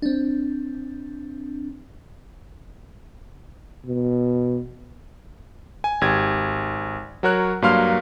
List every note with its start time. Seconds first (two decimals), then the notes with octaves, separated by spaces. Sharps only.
0.02 C4 D4
3.86 B2
5.84 G#5
6.01 G#1 G4 G#6
7.23 F#3 F#4 A#4 C#5 F#6
7.62 G2 F#3 A#3 F5 C6 F6